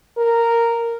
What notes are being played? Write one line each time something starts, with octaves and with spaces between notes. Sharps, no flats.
A#4